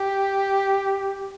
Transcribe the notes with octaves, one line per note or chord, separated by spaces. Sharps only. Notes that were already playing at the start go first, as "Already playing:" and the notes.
Already playing: G4